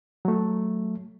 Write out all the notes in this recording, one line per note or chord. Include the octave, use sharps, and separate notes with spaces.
F#3 A3